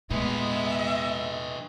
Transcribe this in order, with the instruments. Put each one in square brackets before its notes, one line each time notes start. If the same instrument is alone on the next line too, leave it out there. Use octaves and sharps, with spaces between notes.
[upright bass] E2 A#2 [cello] G#3 B3 [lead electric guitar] D#4 B4 [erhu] E5